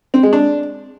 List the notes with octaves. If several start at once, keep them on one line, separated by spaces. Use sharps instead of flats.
C4
G#3
D4